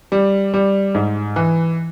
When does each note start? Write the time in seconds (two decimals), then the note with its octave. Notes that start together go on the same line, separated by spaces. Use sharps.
0.12 G3
0.54 G3
0.95 G#2
1.36 E3